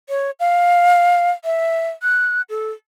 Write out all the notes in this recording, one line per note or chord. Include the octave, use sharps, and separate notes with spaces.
C#5
F5
E5
F#6
A4